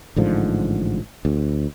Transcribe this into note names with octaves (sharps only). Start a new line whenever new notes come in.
A1 G#2 D3 F3
D2